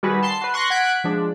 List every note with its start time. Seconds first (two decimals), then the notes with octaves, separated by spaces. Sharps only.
0.03 D#3 G3 F#4 G#4 B4
0.22 A5 C6 C7
0.41 F#4 B4
0.54 C6 C#6 F#6 A#6
0.70 F#5 F#6 G#6 B6 D7
1.04 F3 G#3 D4